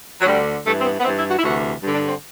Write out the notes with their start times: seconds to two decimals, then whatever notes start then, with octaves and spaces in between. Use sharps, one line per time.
0.21 F#3
0.26 D2 D3 G3
0.65 G2 E3 A3
0.79 C4
0.84 B3
0.99 B3
1.04 G2 E3 C4
1.18 E4
1.30 F#4
1.38 E4
1.43 D2 C3 E3 F#4
1.81 G2
1.86 D3
1.95 D4
2.08 C4